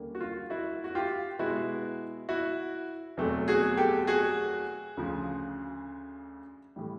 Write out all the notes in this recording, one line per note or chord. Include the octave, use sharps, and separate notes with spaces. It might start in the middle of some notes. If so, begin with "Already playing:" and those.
Already playing: D#2 D3 G3 A#3 C#4
F#4
F4
E4 F#4
F#4
F4 G4
B2 G#3 B3 E4 F#4
E4 F#4
E2 B2 F#3 A3 C4
F#4 G#4
G4 A4
F#4 G#4
D2 C#3 F3
A2 E3 G3